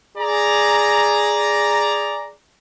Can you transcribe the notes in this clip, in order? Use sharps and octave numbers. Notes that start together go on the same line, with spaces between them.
G#4 D5 A#5